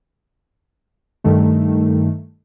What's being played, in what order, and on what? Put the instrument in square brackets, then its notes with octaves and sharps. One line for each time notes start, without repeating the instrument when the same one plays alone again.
[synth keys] G2 D#3 A3